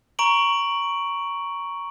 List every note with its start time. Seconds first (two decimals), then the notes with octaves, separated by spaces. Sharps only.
0.19 A#5 C#6 D7 F#7